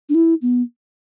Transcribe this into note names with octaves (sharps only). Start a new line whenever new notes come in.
D4
E4
B3